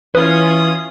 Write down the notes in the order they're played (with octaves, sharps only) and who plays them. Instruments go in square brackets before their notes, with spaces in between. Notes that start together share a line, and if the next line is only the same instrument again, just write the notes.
[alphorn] E3 [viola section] C#4 F4 [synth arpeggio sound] B4 [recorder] D#6